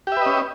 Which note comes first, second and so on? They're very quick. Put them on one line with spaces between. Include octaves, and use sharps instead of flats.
G4 E5 B4 D#5 C#4